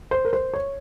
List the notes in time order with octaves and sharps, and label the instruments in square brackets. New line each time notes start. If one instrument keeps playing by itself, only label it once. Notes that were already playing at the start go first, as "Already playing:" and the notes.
[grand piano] C5
A#4
C5
C#5